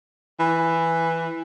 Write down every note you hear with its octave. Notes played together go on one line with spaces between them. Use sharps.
E3